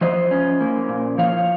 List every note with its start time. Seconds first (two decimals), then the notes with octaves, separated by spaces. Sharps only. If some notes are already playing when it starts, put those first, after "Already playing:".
0.01 F3 C5 D#5
0.31 C#4
0.61 A#3
0.89 A#2
1.18 F3 C#5 F5